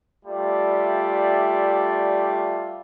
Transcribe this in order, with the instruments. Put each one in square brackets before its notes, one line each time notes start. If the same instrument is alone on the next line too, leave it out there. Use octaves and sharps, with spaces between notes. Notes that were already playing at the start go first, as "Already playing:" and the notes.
[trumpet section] G3 A3 F4 D5 E5